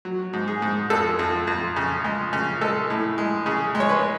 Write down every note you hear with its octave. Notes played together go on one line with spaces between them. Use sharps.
F#3
G#2
G#4
G#2
F2 A4
F2
F2
C#3
G#3
C#3
G#3 A4
A2
G#3
C#3 G#4
G#3
C#5
B4